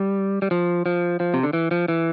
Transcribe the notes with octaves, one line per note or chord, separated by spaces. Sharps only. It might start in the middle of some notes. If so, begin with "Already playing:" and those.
Already playing: G3
G3
F3
F3
F3
C3
D3
E3
F3
E3